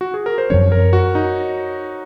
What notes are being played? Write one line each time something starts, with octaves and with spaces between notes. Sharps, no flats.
F#4
G#4
A#4
C5
F#2 F3 C4 C#5
A#4
F#4
D#4